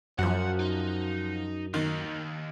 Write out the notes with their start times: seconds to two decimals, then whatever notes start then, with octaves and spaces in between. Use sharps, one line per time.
0.19 F#2 F3 F#4 F#5
0.60 D#4
1.74 D#2 D#3